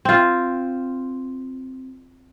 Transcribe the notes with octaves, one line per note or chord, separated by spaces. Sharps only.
C4 F4